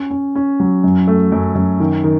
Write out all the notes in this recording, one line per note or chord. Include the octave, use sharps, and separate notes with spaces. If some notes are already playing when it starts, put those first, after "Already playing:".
Already playing: C#4
C#4
C#4
F#3
F#2
A3
F#2
F#2
D#3
D#3